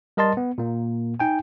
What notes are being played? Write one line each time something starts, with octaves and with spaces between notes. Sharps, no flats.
G3 A#4 D#5 A5 C6 A6
B3
A#2 A#3
D#4 G5 G#5